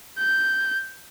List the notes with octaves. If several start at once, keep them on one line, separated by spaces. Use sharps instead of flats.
G6